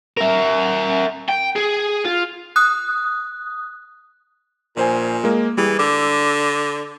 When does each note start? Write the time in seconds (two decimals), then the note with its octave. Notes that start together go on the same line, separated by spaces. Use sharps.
0.17 A#4 E5
1.28 G5
1.56 G#4
2.05 F4
2.56 D#6 F#6
4.77 A#1 A#2 C5 G#5
5.24 G#3 A#3
5.57 E3 G3 G#4
5.79 D3 D6 E6